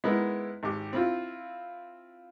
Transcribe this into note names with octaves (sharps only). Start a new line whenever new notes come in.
G#3 B3 D#4 E4 A#4
G#1 G4
C4 E4 F4